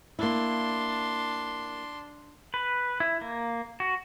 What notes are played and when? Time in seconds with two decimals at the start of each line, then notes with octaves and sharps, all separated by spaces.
0.19 A#3 D4 E4 C6
2.54 B4
3.00 E4
3.21 A#3
3.80 F#4